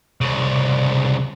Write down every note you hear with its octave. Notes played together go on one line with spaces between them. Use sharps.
C2 C#3